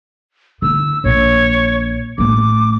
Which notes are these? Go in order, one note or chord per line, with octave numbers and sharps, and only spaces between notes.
D3 E4 E6
A#1 C#5
A1 A3 D6